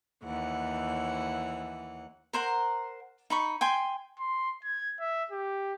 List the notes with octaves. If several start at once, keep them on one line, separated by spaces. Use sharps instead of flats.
D#2 E3 F#5
A#4 C5 F#5 A#5
D#4 B5 C#6
G5 G#5 C6
C6
G#6
E5
G4